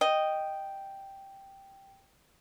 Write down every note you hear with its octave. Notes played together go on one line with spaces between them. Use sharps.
D#5 G5